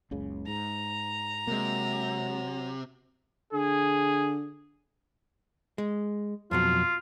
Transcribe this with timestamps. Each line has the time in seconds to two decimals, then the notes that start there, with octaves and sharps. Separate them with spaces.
0.11 F#1 C#2 C#3
0.47 G#2 A#5
1.47 C3 F#3 G#3 A#3
3.53 D3 G#4
5.78 G#3
6.51 F2 B2 F#3 F4